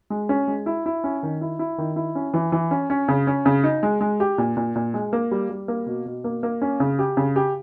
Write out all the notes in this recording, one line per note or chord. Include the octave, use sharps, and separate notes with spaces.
G#3
C#4
G#3
E4
E4
C#4
D#3
E4
E4
D#3
E4
C#4
E3
E3
C#4
C#4
C#3
C#4
C#3
D#4
G#3
G#3
G4
A#2
A#2
A#2
G#3
A#3
G3
G3
A#3
B2
B2
A#3
A#3
C#4
C#3
G4
C#3
G4